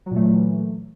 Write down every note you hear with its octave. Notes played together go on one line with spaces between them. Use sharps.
A#2 E3 F#3 A3